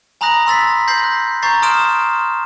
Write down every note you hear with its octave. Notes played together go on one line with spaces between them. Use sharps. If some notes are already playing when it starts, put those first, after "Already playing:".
G#5 A#5 B5 D#6 F#6 A#6
C6 E6 A6 B6
G6 A#6 C7 F#7
F#6
A#5 C#6 G6 A6 C7
A5 C6 D#6 F6 D7 E7